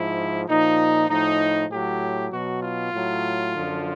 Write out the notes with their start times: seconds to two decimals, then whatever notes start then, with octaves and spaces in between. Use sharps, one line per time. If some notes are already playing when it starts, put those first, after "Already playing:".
Already playing: G#2 F3 E4
0.48 A#2 F3 D#4
1.09 A2 F3 D#4
1.70 A2 F#3 G4
2.32 B2 F#3 F#4
2.63 F4
2.93 A2 F#3
3.55 F#2 D3 F3